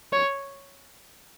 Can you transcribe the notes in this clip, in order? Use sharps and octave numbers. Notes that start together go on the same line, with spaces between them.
C#5